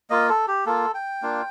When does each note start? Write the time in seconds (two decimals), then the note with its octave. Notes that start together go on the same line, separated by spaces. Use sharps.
0.10 A#3 F4 D#5
0.29 A4
0.48 G4
0.66 A#3 F4 A4
0.95 G5
1.22 A#3 D4 F4